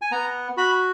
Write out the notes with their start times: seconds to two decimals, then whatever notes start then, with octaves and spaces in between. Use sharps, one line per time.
0.02 G#5
0.11 B3 A#5
0.57 F#4 B5